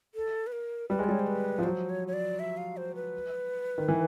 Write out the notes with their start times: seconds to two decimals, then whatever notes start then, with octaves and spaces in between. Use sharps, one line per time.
0.15 A4
0.47 B4
0.52 A#4
0.89 G3 B4
0.99 G#3
1.04 D5
1.09 G3 C#5
1.20 C5
1.27 B4
1.59 F3
1.63 F#3 C5
1.90 C#5
2.08 C#5
2.13 D5
2.39 E5
2.57 F5
2.77 C5
2.95 B4
3.78 D#3
3.88 E3